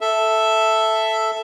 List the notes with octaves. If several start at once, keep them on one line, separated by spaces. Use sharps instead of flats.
A4 E5